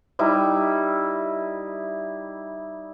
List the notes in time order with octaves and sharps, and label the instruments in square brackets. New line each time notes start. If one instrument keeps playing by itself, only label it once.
[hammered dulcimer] G3 D#4 E4